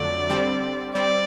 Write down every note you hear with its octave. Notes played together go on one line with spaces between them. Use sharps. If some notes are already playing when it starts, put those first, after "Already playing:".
Already playing: F2 D3 F#3 A3 D5
D3 G3 C4
G3 C4 D5